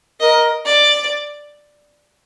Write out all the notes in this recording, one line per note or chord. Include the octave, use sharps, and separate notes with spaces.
A#4 D#5
D5